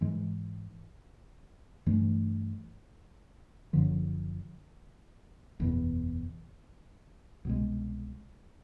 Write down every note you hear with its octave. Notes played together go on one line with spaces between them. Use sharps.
G#2 E3 G#3
G2 E3 A3
F#1 F#2 D3 F3
F#1 E2 B2
C2 B2 G#3